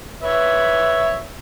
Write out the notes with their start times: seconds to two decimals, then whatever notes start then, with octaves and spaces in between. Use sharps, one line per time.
0.22 B4 C#5 E5